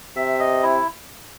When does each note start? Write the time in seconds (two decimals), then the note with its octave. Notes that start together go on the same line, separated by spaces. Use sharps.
0.16 C3 E5
0.40 D#5
0.63 E4